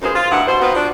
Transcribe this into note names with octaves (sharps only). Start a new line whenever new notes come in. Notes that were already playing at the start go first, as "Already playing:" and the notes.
F#2 D#4 F4 G#4 B4 C5
F4
D2 G2 D#4 E4 F#5
B2 C5
B3 C4 D#4 F4 F#4 B4
F3 D4 F#4